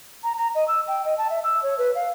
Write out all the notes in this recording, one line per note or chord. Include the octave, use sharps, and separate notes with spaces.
A#5
A#5
D#5
E6
G5
D#5
A5
E5
E6
C#5
B4
F5